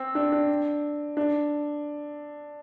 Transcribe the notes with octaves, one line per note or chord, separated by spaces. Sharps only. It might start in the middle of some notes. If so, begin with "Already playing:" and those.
Already playing: C4
D4
D4
D4